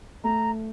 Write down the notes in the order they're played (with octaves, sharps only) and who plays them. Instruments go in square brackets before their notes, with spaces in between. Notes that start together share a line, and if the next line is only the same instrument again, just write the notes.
[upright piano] A3 [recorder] A#5